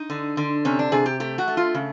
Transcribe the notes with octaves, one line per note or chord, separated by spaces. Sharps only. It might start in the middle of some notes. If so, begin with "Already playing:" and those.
Already playing: D#4
D3
D3
C3 C#4
D4
C3 G#4
G4
A3 G4
F#4
A3
F4
C#3